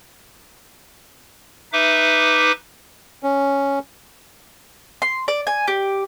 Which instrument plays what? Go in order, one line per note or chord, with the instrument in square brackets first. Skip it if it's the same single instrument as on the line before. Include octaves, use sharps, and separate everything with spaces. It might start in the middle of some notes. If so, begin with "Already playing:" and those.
[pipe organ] D#4 B4 E5 D6
[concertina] C#4
[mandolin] C6
D5
G#5
G4